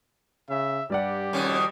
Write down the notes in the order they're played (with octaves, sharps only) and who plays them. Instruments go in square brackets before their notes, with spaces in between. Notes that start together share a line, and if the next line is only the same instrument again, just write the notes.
[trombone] C#3 [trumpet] E5
[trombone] G2 [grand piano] G3 D5 F#5 [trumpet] G4
[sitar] F2 B2 D#3 [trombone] C#4